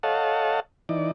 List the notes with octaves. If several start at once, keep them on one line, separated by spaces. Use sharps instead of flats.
A4 C#5 D#5 F5 F#5 A5
E3 D#4 D5